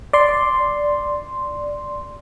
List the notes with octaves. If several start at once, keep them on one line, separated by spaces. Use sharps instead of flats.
D5 C6